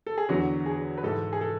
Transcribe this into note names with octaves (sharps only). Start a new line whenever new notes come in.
A4
G#4
E2 D3 F#3 F#4
G#4
B4
G#2 E3 A4
G#4
A4